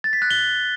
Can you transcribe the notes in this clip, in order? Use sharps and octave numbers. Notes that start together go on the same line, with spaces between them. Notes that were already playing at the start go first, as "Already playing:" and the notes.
A6
B6
F#6
G7